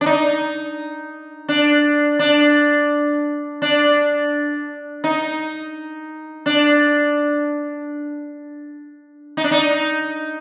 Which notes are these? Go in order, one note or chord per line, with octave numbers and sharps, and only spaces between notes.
D4
D#4
D4
D4
D4
D#4
D4
D#4
D4
D#4